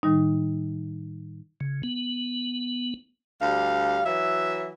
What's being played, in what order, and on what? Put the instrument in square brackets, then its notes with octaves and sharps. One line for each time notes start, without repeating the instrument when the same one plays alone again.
[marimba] A2 D#3 G3 D#4
[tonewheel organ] C#3
B3
[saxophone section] D2 G3 F5
E3 F#3 E5